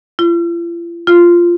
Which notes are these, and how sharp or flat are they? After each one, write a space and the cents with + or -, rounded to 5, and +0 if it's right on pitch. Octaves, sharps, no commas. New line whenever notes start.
F4 -45
F4 -10